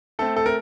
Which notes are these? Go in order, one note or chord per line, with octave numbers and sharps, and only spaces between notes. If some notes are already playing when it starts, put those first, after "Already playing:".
A3 C4 A4
A4
A#4